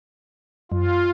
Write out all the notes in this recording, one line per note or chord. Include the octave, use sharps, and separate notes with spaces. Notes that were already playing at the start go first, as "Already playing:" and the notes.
F#2 F4